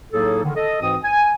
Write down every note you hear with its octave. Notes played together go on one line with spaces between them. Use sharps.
A2 F#3 A#3 D#4 G#4 A4
D3 D#3
A4 D#5
G#2 E3 C4 F#4 D#6
G#5